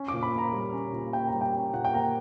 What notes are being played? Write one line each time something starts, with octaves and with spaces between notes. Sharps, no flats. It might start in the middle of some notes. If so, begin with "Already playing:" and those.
Already playing: C#4
D6
A#2
B5
A#3 A#5
G3
C#4
A#2
A#3 G5
A#5
G3
G5
C#4
A#2 F#5
G5
A#3 A#5